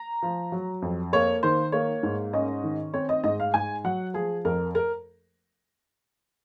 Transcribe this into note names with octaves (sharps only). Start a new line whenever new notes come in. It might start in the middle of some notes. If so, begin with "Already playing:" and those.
Already playing: A#5
F3
F#3
F2
A#3 C#5
D#3 C5
A#3 C#5
G#2
C#4 D#5
D#3
C4 C#5
D#5
G#2 D#5
F5
G#2 G#5
F#3 F#5
F3 G#4
F2 A#4
A#4